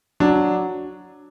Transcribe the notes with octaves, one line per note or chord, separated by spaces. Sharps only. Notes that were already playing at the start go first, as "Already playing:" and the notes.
F#3 D4